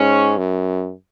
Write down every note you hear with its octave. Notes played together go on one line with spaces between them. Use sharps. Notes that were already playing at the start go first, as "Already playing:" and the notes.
Already playing: G#2 C#4
F#2